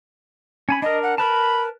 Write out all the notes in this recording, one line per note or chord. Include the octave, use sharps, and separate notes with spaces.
C#4 G#5 B5
D4 A#4 D#5
F#5
A#4 B4 A5 B5